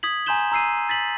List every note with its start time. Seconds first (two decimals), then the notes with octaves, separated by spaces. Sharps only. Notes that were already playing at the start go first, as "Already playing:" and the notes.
0.03 D#6 G#6 B6 F#7
0.26 G#5 A#5 C6 G6 E7 G7
0.52 A#5 E6 C7 D#7
0.89 A6 B6 F#7